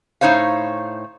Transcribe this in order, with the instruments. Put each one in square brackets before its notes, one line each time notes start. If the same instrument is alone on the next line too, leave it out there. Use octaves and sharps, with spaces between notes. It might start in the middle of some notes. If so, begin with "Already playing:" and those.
[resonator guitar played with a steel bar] A2 D#4 C5 C#5 F5